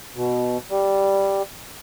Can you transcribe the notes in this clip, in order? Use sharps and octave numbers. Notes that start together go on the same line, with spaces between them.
B2
G3